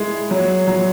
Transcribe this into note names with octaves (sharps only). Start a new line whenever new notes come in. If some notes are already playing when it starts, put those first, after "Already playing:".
Already playing: G#3 E4
F#3
F#3